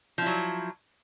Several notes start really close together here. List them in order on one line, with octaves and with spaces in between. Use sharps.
F3 E4 F#3